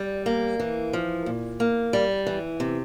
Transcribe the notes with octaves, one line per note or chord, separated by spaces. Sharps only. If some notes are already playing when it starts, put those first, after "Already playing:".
Already playing: G3
A#3
E3
F3
A#2
A#3
G3
E3
C3